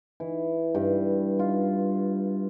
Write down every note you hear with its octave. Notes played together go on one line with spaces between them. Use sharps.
E3
G2
F4